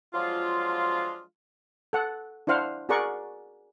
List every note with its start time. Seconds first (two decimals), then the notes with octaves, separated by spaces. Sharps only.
0.14 F3 F#3 G#3 D4 F4
1.93 A4 F#5
2.47 D4 E4 C5 F5 F#5
2.89 F#4 G#4 A#4 D5 F#5 C#6